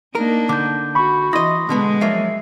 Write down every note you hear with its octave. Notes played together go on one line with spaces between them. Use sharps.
A#3 D4 D#4 A#4
D3 D6 G6
F#4 B5 C#6
E3 E4 D#5 C6 D#6 A#6
B2 D3 G#3 B3
F3 F#3 A#3 E5 C7